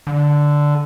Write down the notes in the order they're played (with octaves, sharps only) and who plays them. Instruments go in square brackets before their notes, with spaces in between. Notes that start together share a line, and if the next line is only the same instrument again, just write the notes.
[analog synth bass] D3